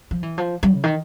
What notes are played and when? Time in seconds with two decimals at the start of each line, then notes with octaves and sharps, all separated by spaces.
0.11 F3
0.23 E3
0.38 F3
0.63 G3
0.73 C#3
0.84 D#3